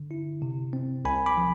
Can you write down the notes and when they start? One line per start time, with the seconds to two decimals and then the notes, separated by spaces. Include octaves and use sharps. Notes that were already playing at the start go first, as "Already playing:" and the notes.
Already playing: D3
0.11 E4
0.42 C3
0.73 C4
1.05 C2 G#5 B5
1.26 B5 D6
1.37 F3